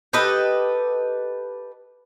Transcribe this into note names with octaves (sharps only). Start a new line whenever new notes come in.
G4 A4 B4 D#5